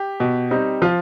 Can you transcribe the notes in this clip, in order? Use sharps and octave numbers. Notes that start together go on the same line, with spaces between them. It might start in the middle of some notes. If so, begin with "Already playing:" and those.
Already playing: G4
B2
G3 C4 D#4
F3 F4